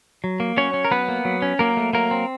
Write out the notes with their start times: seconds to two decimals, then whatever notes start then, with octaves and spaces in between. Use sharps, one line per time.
0.24 F#3
0.40 A#3
0.57 F#3 C#4 C#5
0.74 C#4
0.85 A#4
0.91 F#3 B3 B4
1.08 A#3
1.25 F#3
1.42 C#4
1.59 F#3 A#3 A#4
1.77 A3
1.93 F#3 A#3 A#4
2.11 C4